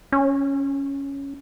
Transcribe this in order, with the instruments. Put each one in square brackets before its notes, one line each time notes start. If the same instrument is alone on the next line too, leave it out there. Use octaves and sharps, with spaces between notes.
[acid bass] C#4